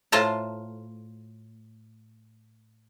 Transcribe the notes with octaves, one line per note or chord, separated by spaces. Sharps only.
A2 F4 C5 A5 A#5